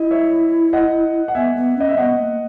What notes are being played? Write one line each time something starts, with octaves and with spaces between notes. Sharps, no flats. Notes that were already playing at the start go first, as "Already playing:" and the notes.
Already playing: E4 D#5
C#5 E5
D#5 F#5
F#5
B3 E5 G#5
B3
C#4 D#5
E5
B3 D#5 F#5
A#3